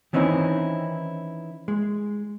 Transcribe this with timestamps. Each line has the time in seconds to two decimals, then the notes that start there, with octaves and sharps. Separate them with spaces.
0.13 D#3 E3 C4 C#4 D#4 E4
1.68 G#3